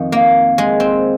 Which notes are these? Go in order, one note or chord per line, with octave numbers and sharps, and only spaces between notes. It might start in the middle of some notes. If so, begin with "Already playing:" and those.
Already playing: F2 D#3
A#3
G#3
C4